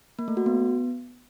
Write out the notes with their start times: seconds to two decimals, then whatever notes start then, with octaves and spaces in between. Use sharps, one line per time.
0.19 A#3
0.28 A3
0.37 F#4
0.46 B3